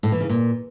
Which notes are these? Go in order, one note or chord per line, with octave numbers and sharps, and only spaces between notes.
A2
E3
C#3
A#2